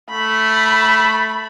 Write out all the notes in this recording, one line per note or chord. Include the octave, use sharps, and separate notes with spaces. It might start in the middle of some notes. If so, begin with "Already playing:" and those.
A3 B5